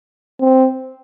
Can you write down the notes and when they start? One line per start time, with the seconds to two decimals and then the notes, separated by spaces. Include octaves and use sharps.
0.41 C4